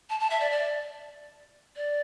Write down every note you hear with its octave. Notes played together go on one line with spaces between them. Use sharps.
A5
A5
E5
D5
D5
D5